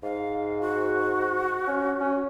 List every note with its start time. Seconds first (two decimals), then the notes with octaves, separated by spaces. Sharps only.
0.03 G#2 F5
0.61 F#4
1.67 C#4
2.00 C#4